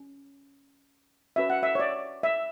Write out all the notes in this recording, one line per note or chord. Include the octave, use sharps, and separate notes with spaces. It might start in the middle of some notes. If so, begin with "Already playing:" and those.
Already playing: C#4
C#4 F#4 B4 E5
F#5
E5
C#5
D5
E5